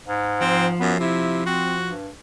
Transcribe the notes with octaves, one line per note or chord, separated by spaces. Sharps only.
G#2
F3 C4
F#2 B3
C3 E4
C4 F#4
G2